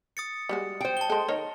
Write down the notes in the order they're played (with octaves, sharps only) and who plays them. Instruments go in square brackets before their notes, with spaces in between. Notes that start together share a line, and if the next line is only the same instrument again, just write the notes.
[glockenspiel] D#6 A6 C#7
[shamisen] G3 G#3 F#4
[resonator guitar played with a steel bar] C5 G5
[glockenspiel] A5 G7
[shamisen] G#3 A4
D#3 A#4 C#5